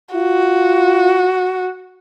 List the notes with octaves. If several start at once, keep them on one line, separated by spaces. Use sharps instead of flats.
F4 F#4